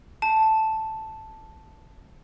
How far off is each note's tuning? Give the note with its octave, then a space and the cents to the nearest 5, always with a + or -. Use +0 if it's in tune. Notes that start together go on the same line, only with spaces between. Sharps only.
A5 +0